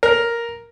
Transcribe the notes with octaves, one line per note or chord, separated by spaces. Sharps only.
A#4